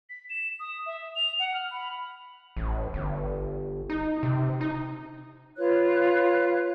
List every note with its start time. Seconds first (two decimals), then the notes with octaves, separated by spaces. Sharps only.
0.09 B6
0.30 E7
0.60 D#6
0.86 E5
1.15 F7
1.39 F#5
1.54 F6
1.71 B5
2.57 A1
2.94 G1
3.90 D#4
4.23 C3
4.61 D#4
5.57 F4 B4 C#5 F#6